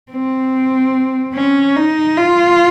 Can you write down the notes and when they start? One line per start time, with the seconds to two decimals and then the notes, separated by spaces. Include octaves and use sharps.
0.11 C4
1.35 C#4
1.76 D#4
2.17 F4